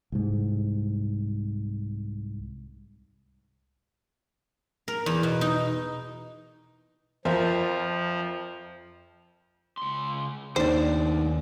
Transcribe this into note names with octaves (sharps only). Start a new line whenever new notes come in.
C2 G#2
A#4
E2
B2
D#4
F2 F3 F4 A#4 C5 E5
C#2 C6
D#2 A3 D4 D#4 C5